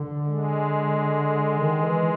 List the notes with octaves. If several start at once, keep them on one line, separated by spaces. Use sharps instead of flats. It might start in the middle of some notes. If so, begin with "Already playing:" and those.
Already playing: D3
G#3
D#3
E3